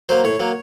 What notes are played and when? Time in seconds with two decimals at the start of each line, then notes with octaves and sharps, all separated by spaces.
0.09 F#3 A#3 C5
0.24 A2 C#5
0.40 F#3 A#3